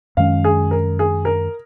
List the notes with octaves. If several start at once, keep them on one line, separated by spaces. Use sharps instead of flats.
F#2 D#3 G#3 C#4 F5
G#4
A#4
G#4
A#4